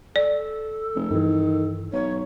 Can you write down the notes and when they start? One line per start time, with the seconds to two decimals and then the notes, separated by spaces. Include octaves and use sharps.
0.16 A4 D5
0.95 F1
1.11 G2 D#3 E3
1.93 B1 C#5